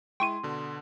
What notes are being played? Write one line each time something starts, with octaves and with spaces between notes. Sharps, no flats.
G#3 E4 G5 C6 C#6 D#7
B2 D3